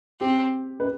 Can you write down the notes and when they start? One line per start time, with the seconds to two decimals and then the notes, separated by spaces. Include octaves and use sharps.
0.20 C4 G4
0.80 B4